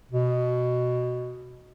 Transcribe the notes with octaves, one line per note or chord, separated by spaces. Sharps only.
B2